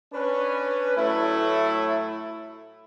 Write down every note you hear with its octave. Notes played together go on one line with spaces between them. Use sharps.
C#4 D4 B4
A2 F#3 A3 E4